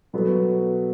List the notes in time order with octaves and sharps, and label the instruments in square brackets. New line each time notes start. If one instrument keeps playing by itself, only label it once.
[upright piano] B2 F#3 B3 F#4 A4